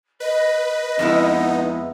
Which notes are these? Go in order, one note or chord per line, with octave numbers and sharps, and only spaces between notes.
B4 D#5
F2 G#3 B3 D#4 E4